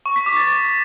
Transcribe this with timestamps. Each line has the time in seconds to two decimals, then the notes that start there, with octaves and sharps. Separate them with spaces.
0.06 C#6
0.16 B6
0.26 D6
0.37 A6